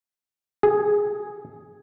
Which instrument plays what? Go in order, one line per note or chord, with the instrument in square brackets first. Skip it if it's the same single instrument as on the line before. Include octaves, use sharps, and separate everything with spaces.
[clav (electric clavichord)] G#4